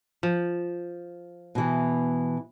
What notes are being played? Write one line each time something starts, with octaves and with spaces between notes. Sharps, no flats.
F3
B2 E3